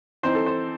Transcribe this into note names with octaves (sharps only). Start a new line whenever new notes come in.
E3 C4 D#4 C5
A4
C5